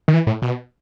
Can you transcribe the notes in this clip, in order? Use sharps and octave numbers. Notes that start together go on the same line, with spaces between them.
D#3
E3
A2
B2